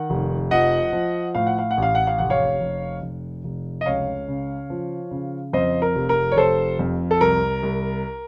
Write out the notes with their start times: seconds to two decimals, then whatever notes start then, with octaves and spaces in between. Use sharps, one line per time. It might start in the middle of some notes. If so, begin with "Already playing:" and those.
Already playing: D#3 F#5
0.10 F1
0.51 F3 D#5 F#5
0.93 F3
1.35 A2 F5
1.47 F#5
1.58 F5
1.71 F#5
1.77 A1
1.82 F5
1.95 F#5
2.07 F5
2.18 F1 F#5
2.30 C#5 F5
2.60 F1
3.02 F1
3.44 F1
3.81 D#5
3.86 C#2 C#5 F5
4.28 C#3
4.70 F3
5.11 C#3
5.53 F2 C5 D#5
5.82 A#4
5.96 F1
6.09 A#4
6.32 C#5
6.36 F1 A4 C5
6.79 F2
7.11 A4
7.21 C2 A#4
7.63 C2